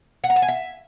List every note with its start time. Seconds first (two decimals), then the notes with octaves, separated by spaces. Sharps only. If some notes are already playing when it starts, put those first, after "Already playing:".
0.24 F#5
0.30 A#5
0.36 A5
0.42 G#5
0.48 E5